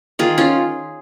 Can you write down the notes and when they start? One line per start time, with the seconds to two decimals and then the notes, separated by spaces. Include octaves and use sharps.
0.19 D#3 F4 G#4
0.38 C#4 F4